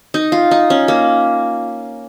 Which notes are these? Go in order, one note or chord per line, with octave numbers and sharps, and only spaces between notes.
D#4
F4
D#4
C#4
A#3